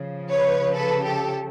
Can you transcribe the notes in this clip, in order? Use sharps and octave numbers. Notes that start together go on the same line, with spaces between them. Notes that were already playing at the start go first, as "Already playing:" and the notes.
Already playing: C#3 F3
B4 C#5
A4 B4
G4 A4